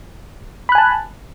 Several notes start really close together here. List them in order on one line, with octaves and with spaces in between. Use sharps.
B5 F#6 G#5 A5